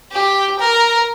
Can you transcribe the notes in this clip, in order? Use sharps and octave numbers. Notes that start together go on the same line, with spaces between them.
G4
A#4